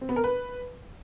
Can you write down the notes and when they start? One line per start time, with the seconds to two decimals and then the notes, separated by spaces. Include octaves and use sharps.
0.01 C4
0.09 B3
0.16 A#4
0.24 B4